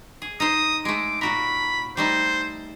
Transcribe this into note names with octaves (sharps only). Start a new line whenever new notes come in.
G#4
D#4 C5 D#6
G#3 A3 D6
A#2 F#4 A#4 B5
G3 A3 D#4 C5